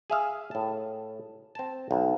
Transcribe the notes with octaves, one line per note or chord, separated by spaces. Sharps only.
G#4 E5 F5
A2 A5
C4 A5
B1